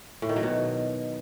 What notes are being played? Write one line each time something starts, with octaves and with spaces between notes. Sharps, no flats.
A2
D#3
F#3
B2